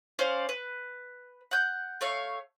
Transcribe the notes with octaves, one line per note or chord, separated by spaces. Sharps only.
C#4 C5 D5 F5
B4
F#5 G6
A3 C#5 F5